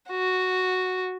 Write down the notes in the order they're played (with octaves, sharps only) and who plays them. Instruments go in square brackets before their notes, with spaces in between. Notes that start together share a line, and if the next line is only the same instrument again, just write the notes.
[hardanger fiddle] F#4